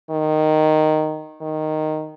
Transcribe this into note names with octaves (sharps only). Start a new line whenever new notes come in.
D#3
D#3